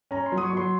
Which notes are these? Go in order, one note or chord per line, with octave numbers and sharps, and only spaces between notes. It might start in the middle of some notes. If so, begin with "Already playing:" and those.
C#4 A#5
C6
F#3
D#6
C#6
F#3 C6